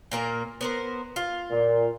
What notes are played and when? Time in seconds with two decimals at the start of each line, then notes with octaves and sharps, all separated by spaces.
0.11 A#2 A#3 A#4
0.61 B3 A#4 C5
1.16 F4
1.51 A#2